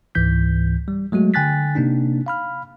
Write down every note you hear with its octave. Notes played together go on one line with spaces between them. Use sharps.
C#2 G#2 E3 G6 B6
G3
F#3 G#3 A3 F#4
D3 G5 G#5 F#6 A6 B6
C3 A#3 D4 D#4
F5 B5 F6